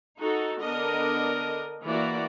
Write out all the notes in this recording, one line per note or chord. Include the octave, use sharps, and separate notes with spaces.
D#4 F#4 A4
D3 B3 D4 A#4 D#5
E3 A#3 F#4 D5